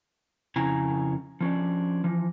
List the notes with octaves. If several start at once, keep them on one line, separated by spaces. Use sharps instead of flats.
F2 C#3 E4 G#5 A#5
F3 C#4 D4
E3 F3